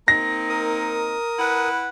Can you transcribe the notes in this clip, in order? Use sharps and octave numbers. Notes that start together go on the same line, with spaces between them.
A#3 C4 D#4 A#6
A#4 D#6
E4 B4 F#5